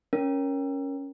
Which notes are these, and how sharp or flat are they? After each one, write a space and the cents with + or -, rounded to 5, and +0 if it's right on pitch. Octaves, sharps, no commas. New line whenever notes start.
C#4 +0 A#4 +10